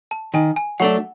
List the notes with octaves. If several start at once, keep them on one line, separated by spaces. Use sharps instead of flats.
A5
D#3 G#5
G#5
F#3 A3 D4 F#5